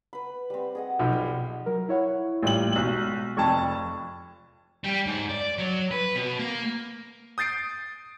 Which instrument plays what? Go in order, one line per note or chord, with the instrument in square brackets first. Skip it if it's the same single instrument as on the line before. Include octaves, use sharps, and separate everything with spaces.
[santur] B4 B5
G3 C4
G#4 D#5 F#5
[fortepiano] B1 F3
[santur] G3
[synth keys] F#3 A#4
E4 C#5 F#5
[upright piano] A1 G3 F#7 [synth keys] A#3 F4
[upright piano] B1 F#7 [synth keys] G#3 C#6
[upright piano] F1 F2 A5 [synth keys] C#6 G#6
[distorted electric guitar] G3
G#2
D5
F#3
B4
B2
A#3
[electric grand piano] D#6 G6 A6 C7 D7